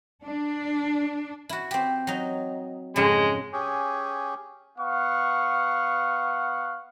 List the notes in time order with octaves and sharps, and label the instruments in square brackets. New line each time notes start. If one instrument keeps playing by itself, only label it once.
[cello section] D4
[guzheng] E4 F#4
C4 G4
F#3 D#4
[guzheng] F2 G#2 C#3 [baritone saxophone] G#3
[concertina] C#4 G4 G#4
[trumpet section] B3 F5 F#5 C#6